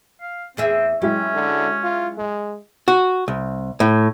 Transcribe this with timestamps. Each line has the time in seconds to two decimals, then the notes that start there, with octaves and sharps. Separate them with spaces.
0.22 F5
0.57 E2 C4 G#4 E5
1.02 F#3 G#3 C#4 E4 G4
1.35 D3
1.83 F4
2.18 G#3
2.88 F#4
3.28 C2
3.80 A2